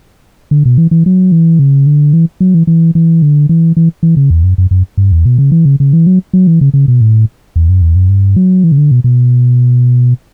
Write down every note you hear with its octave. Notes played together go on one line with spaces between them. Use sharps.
D3
B2
E3
E3
F#3
E3
C#3
D3
E3
F#3
E3
E3
E3
D3
E3
E3
E3
C#3
E2
F#2
F#2
F#2
G2
E2
B2
C#3
E3
C#3
C#3
E3
F#3
F#3
E3
C#3
C#3
B2
A2
E2
F#2
E2
F#2
G2
F#3
E3
C#3
D3
B2
B2